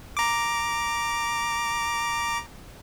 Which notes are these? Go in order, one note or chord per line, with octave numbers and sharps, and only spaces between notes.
A#5 D6